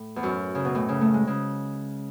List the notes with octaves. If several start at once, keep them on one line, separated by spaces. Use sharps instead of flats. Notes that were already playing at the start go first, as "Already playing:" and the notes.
Already playing: A2
E2
F#2
C#3
B2
A2
C#3
A3
G#3
C#3